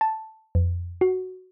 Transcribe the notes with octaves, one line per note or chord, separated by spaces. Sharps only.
A5
F2
F#4